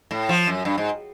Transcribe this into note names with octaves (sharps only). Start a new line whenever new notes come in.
A2
F3
F#2
G2
G#2